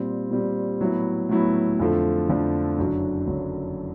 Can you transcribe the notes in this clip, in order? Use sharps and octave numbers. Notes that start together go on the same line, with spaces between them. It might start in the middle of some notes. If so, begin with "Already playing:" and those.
Already playing: A#2 G3 C4
A#2 G3 C4
A2 F#3 B3 E4
A2 F#3 B3 E4
F2 D3 F3 A3
F2 D3 F3 A3
F#1 F#2 D3 F#3
F#1 F#2 D3 F#3